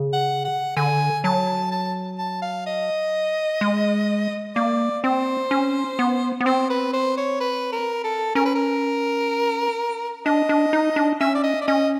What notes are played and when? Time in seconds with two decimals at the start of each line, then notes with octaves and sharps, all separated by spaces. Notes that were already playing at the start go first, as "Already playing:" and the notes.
Already playing: C#3
0.13 F#5
0.44 F#5
0.76 D3 G#5
1.24 F#3 A5
1.72 A5
2.18 A5
2.42 F5
2.66 D#5
3.61 G#3
4.56 A#3 D5
5.04 C4 C5
5.51 C#4
5.99 B3
6.40 B3
6.46 C4 C5
6.70 B4
6.93 C5
7.17 C#5
7.40 B4
7.72 A#4
8.04 A4
8.35 C#4 A#4
8.45 B4
8.55 A#4
10.26 D4 D#5
10.49 D4
10.73 D#4
10.96 D4
11.20 C#4 E5
11.35 D5
11.43 D#5
11.61 D5
11.67 C#4 D#5